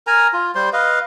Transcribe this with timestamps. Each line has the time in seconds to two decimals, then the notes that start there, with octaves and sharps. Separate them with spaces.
0.07 A#4 G#5 A#5
0.33 F4
0.55 G3 C5 C6
0.73 B4 D#5 F5